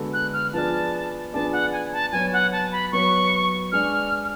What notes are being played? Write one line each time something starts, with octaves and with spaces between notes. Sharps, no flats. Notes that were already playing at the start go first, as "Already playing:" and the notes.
Already playing: D3 G#3 B3 F#4 A4
F#6
F6
F3 B3 D4 G#4 D5 A5
F3 B3 D4 G#4 D5 A5
F#5
G#5
A5
F#3 B3 F#4 C#5 G#5
F#5
A5
B5
F#3 B3 F#4 C#5 C#6
G#3 D4 G#4 B4 D5 F6